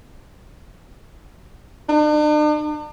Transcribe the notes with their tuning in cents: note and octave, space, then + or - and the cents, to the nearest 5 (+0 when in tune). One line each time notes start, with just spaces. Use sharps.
D4 +45